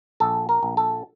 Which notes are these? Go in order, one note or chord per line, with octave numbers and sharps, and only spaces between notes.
A#1 A4
A#4
A#1
A4